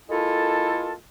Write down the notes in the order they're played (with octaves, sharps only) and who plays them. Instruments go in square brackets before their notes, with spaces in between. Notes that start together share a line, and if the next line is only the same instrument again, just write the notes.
[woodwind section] G#3 A#3 E4 F4 A4